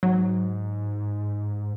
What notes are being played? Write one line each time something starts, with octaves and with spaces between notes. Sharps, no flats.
G#2 F#3